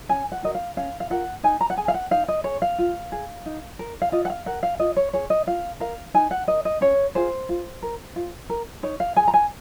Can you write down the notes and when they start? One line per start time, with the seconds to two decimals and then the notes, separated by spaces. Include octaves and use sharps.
0.09 C#4 G#5
0.32 F#5
0.43 F#4 A#4 D#5
0.55 F5
0.77 C#4 F5
1.00 F5
1.10 F4 A#4 F#5
1.43 D#4 G#5
1.61 A#5
1.70 F#5
1.77 G#4 G#5
1.88 F5
1.94 F#5
2.11 D#4 F5
2.28 D#5
2.44 G#4 C#5
2.62 F5
2.78 F4
3.12 G#4
3.46 D#4
3.79 A#4
4.02 F5
4.12 F4 D#5
4.25 F#5
4.30 F5
4.46 A#4 F#5
4.63 F5
4.79 F4 D#5
4.97 C#5
5.13 G#4 C#5
5.30 D#5
5.47 F4 F5
5.80 A#4 F5
6.14 D#4 G#5
6.31 F#5
6.47 A#4 D#5
6.65 D#5
6.81 C#4 C#5
7.15 F4 G#4 C5
7.49 F4
7.82 A#4
8.16 F4
8.50 A#4
8.83 D#4 C#5
9.00 F5
9.16 G#4 G#5
9.28 A#5
9.34 G#5